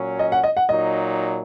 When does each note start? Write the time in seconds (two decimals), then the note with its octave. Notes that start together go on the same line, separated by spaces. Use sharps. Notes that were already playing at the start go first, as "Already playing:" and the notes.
Already playing: A#2 F#3 C#4
0.19 D#5
0.32 F#5
0.44 D#5
0.57 F#5
0.69 A#2 F#3 D#4 D#5